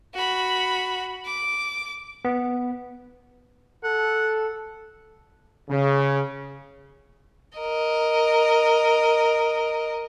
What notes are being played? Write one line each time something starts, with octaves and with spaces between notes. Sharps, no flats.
F#4 B5
D6
B3
A4 F#5
C#3
A#4 D#5